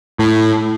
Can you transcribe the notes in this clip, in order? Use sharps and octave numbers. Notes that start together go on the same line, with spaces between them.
A2